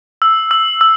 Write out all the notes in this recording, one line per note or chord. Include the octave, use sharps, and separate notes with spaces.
E6
E6
E6